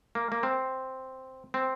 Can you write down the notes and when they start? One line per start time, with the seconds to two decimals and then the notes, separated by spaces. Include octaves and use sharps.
0.15 A#3
0.32 A#3
0.43 C4
1.54 C4